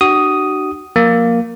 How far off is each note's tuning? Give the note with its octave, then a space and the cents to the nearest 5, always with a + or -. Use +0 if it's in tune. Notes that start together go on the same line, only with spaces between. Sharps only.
D4 +35 F#4 +30 D#6 +0
F3 +35 A#3 +0